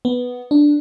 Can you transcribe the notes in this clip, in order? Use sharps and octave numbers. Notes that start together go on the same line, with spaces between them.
B3
D4